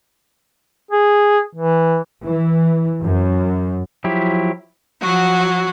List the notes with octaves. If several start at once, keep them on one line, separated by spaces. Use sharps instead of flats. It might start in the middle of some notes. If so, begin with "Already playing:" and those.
G#4
E3
E3
F#2
F3 F#3 E4 G4
F3 F#3 F#4